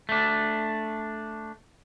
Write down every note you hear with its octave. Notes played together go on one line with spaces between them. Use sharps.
A3 D4